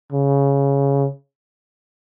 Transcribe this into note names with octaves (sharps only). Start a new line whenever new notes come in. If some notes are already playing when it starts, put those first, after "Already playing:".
C#3